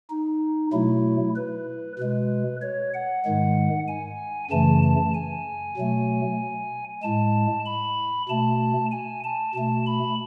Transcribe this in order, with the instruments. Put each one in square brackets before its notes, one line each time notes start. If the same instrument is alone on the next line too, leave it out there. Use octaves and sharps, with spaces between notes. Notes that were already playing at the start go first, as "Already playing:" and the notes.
[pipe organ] D#4
B2 F#3 A3 E4
B4
B2 G#3 B4
C#5
F#5
G#2 D#3 G#3
G#5
F#2 C#3 E3 A3 A5
A5
G#5
B2 F#3 A3
A2 G#3 A5
B5
B2 A3 A5
G#5
A5
B2 A3 A5
B5